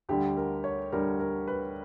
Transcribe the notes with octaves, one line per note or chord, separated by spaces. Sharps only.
D2 D3 G3 G4
A#4
C#5
D2 D3 G3 A#4
A#4
B4